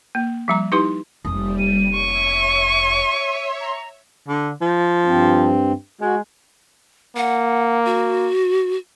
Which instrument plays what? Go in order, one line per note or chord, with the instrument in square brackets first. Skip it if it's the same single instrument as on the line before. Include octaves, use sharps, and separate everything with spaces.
[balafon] A#3
F3 G3 A#5
D#4 E4 G4 B4 C6
[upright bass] F1 A#3 [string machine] G3 [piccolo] D#6
[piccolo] D#7
[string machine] C#5 E5 [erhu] C#6
[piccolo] A#5
[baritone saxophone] D3
F3
[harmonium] G2 C4
[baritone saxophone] G#3 [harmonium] F#4
[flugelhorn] A#3 [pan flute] F#5
[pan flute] F#4